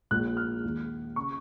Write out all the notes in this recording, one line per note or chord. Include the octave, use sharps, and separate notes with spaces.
A#1 A#2 G#3 F#6
F6
D#2 D#3 G#3
C#3 C#6